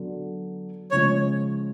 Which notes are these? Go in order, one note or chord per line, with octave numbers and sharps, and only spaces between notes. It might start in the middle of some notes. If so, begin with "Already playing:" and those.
Already playing: D3 F#3 B3
C#3 F3 G#3 C#5